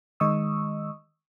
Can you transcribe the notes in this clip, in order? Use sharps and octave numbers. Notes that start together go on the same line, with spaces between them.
D#3 G#3 D#5 C#6 D#6 E6